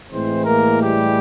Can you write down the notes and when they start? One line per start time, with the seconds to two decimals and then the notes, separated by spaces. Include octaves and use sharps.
0.10 A2 E3 G#3 C4 C5
0.45 A#3 A#4
0.80 G3 G4